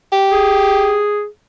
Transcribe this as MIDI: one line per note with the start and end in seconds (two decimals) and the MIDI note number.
0.12 1.02 67
0.31 1.27 68